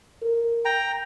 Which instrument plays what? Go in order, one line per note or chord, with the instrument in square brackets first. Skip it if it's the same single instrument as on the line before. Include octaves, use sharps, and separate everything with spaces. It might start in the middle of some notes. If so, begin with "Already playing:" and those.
[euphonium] A#4
[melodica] G5 A#5